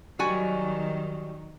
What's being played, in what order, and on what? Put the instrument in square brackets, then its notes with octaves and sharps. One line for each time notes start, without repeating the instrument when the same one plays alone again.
[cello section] D#3 F#3 [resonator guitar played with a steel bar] G3 F#4 G#5